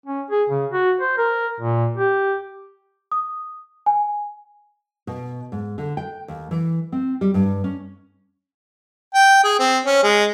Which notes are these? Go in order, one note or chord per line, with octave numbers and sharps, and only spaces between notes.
C#4
G#4
C#3
F#4
C5
A#4
A#2
G4
D#6
G#5
B2
G#2
D3
G5
D#2
E3
C4
G3
G2
C#4
G5
G#4
C4
C#4
G#3